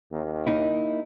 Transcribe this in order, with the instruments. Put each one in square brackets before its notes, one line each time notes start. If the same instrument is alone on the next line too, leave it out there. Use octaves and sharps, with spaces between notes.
[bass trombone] D#2
[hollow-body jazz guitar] A#3 D#4 E4